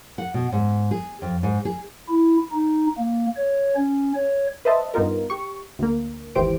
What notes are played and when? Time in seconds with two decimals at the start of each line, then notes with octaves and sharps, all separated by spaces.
0.18 F#5
0.34 B2
0.52 G#2
0.91 G#4
1.22 F2
1.43 G#2
1.65 G#4
2.09 E4
2.52 D#4
2.98 A#3
3.36 C#5
3.76 C#4
4.15 C#5
4.65 B4 C5 D#5 E5 A5
4.94 G2 B3 D#4 F4 A#4
5.30 G4 C#6
5.79 D2 A#3
6.35 G#1 D#2 E3 G4 C5 D7